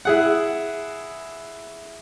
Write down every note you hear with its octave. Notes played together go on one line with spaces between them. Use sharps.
E4 G#4 F#5